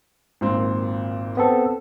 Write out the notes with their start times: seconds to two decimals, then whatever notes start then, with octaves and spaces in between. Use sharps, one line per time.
0.41 G#1 A#2 C4
1.37 B3 C4 A4